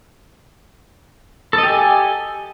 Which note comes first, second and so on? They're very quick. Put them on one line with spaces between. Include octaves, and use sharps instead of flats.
A4 D#5 G4 G#5